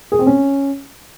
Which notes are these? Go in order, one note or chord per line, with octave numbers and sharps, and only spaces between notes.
G#4
C4
C#4